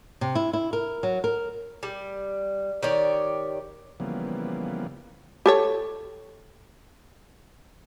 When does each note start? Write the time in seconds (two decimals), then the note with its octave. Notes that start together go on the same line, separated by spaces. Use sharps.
0.21 C3
0.35 E4
0.53 E4
0.73 A#4
1.03 F#3
1.24 A#4
1.83 G3
2.83 D#3 G4 C#5 D5
4.00 C#3 E3 F3 G3 A#3 B3
5.46 G4 A4 C#5